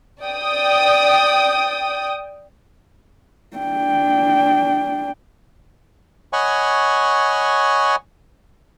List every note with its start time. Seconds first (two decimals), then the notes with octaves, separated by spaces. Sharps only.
0.23 D5 G5 D#6
3.57 D4 G5
6.33 C#5 D#5 F#5 G#5 B5 C#6